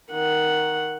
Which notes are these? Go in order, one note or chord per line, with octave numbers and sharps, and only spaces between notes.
D#3 F#5